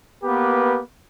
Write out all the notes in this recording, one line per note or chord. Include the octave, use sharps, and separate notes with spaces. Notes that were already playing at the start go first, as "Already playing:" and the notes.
A#3 B3 G4 B4